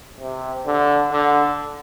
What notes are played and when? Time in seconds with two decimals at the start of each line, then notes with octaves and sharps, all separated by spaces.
0.20 C3
0.66 D3
1.12 D3